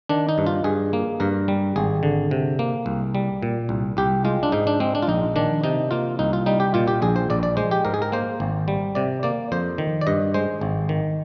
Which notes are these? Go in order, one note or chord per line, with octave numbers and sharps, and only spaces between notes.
D#3 D4
D#4
G2
F4
G2 G#4
A#3
G2 A#4
G3
G#1 G#4
D3
C3
A#3
C2
G3
A#2
C2
C2 G4
G#3 F4
D4
G#2 D#4
D4
G#3 C4
D4
F4
A#1 D#4
D#3 D4
C3 D#4
A#3 F4
C2 D#4
F4
G3 D#4
G4
A#2 F4
G4
A#1 G#4
C5
A#1 D5
D5
G#3 C5
G4
G#2 A#4
G#4
A#4
A#3 C5
G#1
G3
C3 D5
A#3 D5
F2 C5
D#3
D5
G2 D#5
G#3 C5
G#1
D#3